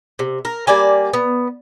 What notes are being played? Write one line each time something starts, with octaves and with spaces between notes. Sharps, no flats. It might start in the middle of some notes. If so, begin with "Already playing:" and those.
C3
A#4
G3 A#3 D5 G#5
B3